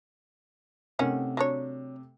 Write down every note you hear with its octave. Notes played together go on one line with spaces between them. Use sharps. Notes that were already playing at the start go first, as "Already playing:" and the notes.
C3 D#3 A3 C#4 F#5
F#3 D4 C#5